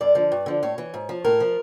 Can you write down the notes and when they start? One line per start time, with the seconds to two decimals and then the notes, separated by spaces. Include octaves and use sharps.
0.01 F#2 D5
0.15 D3 F3
0.32 G2
0.46 D3 F3
0.63 A2 C#5
0.78 E3
0.94 G#2
1.09 F3
1.24 A2 A#4
1.40 F3